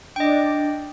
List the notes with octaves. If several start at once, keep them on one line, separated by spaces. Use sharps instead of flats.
D4 D#5 G5